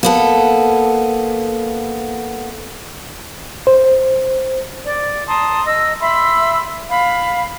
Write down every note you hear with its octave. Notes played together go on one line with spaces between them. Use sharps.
A#3 B3 A4
C5
D5
A5 A#5 C6 D#6
D#5 E6
E5 B5 C6 E6
F5 B5